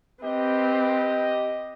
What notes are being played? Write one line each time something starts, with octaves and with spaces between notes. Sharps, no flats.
C4 G4 B4 D#5